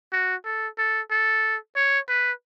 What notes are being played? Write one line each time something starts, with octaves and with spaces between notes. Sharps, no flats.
F#4
A4
A4
A4
C#5
B4